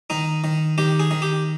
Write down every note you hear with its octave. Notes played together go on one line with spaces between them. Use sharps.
D#3 D#4
D#3
D#3 G4
G#4
D#3
G4